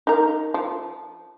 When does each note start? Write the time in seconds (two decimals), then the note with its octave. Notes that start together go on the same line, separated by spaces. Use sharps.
0.07 D#4 A#4
0.54 F3